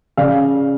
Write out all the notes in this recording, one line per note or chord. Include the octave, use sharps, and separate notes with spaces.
C#3 D5 F5